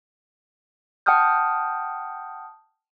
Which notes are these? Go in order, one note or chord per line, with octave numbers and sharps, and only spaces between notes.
F#5 G5 A5 D#6 F6 G6